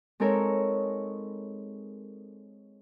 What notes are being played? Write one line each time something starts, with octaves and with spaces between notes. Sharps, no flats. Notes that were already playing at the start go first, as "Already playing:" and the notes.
G#3 C4 D#4 A4 A#4 C#5